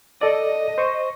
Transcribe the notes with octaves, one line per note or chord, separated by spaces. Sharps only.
A4 D5 D#5
C5 C#6